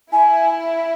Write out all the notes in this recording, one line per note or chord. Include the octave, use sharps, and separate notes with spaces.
E4 G#5